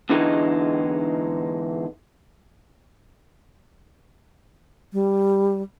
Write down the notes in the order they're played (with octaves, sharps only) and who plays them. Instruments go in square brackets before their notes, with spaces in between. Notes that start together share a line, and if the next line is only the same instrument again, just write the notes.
[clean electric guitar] E2 G#2 D3 E3 G#3 D#4
[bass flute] G3